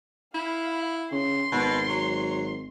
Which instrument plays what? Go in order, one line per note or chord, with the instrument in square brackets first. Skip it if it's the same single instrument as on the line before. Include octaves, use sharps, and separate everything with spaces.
[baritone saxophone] E4 [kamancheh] F5 B5
[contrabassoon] C#3 [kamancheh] C6
[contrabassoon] G#1 [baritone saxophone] B2
[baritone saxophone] F#3